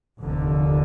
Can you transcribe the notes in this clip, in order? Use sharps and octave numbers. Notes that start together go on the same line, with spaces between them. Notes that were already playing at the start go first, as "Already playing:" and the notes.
F1 D#2 D3